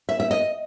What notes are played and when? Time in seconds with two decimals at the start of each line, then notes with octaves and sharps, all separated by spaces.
0.09 E5
0.20 E5
0.31 D#5